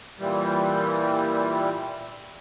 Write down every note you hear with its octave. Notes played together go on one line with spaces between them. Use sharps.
A#2 E3 G3